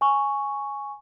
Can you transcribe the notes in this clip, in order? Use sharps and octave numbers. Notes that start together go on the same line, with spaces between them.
G#5 C#6